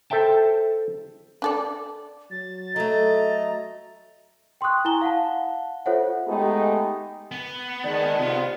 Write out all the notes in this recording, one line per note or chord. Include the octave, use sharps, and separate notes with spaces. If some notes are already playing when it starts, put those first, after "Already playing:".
A4 C5 E5 G5 A5
D4 A4 D5
F#3 A6
F#3 A3 A4 D#5 A#5
G5 C6 C#6 D#6 F#6
E4 G#5 A#5 G7
F5 F#5 A5
F4 A4 C5 C#5 E5 F#5
G#3 A3 B3 D#4 G4 G#4
B3
D#3 G#3 D5 A5
C3 F4